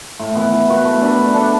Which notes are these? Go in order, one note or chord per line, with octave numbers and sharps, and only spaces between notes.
A2
E3 B3
E3
B3 F#4 B4
A3
D4 B4
A3
D4 A4